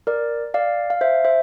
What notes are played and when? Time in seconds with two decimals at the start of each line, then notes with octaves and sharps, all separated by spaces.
0.07 A#4 D5
0.54 D5 F5
0.90 F5
1.01 C5 E5
1.25 C5 E5